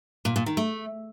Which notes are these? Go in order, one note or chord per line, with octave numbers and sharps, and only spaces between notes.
A#2
A#2
D#3
A3